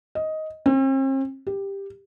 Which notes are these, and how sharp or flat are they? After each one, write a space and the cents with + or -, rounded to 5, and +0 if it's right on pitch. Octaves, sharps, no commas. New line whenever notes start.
D#5 +10
C4 +45
G4 +10